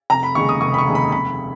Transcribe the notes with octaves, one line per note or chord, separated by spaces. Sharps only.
F1 A#5
B5
D#2 C#3 G#3 C#6
D#6
F1 C#6
B5
C#6
D#2 C#3 G#3
B5
F1 B5